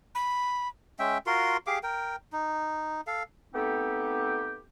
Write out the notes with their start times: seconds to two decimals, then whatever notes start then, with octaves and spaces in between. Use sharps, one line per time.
0.15 B5
0.99 G#3 C#4 E5 G5
1.26 F4 F#4 A#4 C6
1.67 G4 G#4 F5 D6
1.83 A#4 G5
2.33 D#4
3.07 A4 F5
3.54 A3 B3 C4 D#4 G4